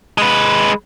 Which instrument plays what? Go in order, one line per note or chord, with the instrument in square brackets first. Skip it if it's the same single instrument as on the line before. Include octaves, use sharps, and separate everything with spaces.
[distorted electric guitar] G#3 B4